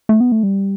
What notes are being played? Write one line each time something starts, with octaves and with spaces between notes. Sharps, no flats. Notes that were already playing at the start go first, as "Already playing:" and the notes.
A3
B3
A3
G3